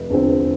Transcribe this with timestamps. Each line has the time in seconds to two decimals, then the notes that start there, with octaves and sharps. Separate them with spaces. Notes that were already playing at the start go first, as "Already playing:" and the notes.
Already playing: F1
0.10 E2 D3 F3 C4